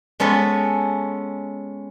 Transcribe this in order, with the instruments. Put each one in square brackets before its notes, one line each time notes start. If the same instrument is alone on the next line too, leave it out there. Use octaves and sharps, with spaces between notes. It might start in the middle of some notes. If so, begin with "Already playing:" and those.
[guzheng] G#3 B3 C#4 A4